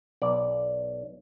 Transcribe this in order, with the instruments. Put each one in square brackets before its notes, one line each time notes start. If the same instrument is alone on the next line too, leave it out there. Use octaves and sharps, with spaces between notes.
[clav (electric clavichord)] B1 D5